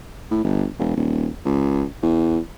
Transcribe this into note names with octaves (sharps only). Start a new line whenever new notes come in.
A2
G1
E1
D#1
C#2
E2